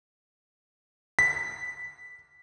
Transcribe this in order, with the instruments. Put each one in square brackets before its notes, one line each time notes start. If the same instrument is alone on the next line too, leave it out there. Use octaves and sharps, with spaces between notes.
[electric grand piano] B6